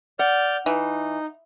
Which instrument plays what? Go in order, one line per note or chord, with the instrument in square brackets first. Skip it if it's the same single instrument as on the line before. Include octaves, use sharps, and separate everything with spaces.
[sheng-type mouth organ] D5 F6 G6 [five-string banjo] F#5
[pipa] E3 [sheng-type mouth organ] D#4